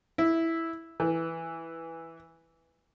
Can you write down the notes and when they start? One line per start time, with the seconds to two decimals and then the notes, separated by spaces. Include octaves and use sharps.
0.18 E4
1.00 E3